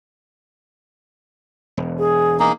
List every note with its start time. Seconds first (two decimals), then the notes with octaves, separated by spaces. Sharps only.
1.77 E1
1.98 G#4
2.40 A#3 D#4 G#4